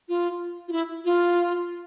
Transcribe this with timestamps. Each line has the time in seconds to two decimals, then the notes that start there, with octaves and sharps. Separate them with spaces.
0.09 F4
0.68 F4
0.72 E4
1.05 F4